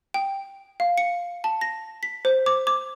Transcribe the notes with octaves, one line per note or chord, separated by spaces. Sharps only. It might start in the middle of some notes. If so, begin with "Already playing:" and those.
G5
F5
C#7
A5
A#6
B6
C5
D6
D6